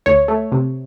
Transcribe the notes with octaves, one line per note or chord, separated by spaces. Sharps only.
D2 C#5
A3
C3